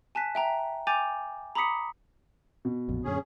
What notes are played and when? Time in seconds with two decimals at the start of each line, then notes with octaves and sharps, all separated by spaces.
0.15 G#5 A5 F#6 B6
0.35 E5 G5 A#5
0.87 G5 G#5 D6 G6 A6 F7
1.55 A#5 B5 D6 D#6 B6 C#7
2.65 B2
2.88 A1 F2 A#2
3.04 F#2 A#2 D3 C#4 G#4